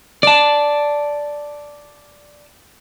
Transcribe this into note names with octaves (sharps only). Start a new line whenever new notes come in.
D5 A5